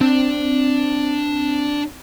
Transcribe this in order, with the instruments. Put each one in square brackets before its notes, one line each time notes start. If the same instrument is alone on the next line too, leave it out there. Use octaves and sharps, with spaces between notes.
[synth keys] C4 [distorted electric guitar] D4